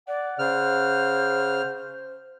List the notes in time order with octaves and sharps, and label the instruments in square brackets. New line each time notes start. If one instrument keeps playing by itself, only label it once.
[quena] D5 [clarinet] F#5
[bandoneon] C#3 F6 [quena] C5